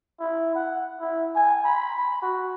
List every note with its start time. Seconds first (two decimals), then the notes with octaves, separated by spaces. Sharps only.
0.20 E4
0.55 F#5
1.00 E4
1.35 G#5
1.64 B5
2.22 F#4